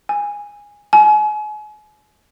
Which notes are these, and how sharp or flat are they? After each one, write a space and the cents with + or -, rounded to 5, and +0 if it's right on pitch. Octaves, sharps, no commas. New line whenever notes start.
G#5 -10
G#5 +35